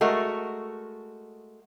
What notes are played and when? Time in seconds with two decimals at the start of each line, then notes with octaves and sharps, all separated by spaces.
0.01 G#3 A3 F#4 A#4